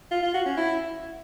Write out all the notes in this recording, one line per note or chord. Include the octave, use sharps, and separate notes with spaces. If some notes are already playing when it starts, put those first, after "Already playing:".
F4
F4
F#4
C#4
E4